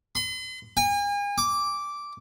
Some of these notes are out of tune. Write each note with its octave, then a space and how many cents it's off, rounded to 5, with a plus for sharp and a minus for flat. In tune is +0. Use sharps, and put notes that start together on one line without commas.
C6 -45
G#5 -40
D6 -10